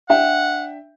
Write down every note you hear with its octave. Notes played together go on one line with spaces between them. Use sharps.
D4 E5 F#5 G5